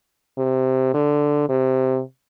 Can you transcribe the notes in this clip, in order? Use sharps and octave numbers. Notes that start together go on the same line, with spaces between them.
C3
D3
C3